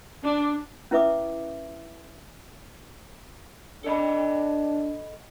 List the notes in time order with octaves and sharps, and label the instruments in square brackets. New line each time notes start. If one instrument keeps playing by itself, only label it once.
[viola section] D4
[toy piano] C#4 E4 B4 E5 D6 D#6
[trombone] D4 [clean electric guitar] A4 D#5 B5